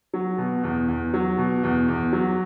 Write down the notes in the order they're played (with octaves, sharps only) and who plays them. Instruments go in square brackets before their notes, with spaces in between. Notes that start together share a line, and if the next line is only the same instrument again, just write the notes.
[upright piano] F#3
B2
E2
E2
F#3
B2
E2
E2
F#3